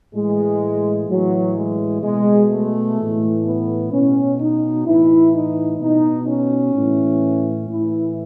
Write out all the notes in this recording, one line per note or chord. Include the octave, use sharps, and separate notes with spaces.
A2 E3 G#3
A2 E3 F#3
G#3
B2 G#3
A3
A2 E3
B3
B2 C#4
D#4
A2 E3 E4
D#4
B2 D#4
C#4
A2 E3
A2 E3 E4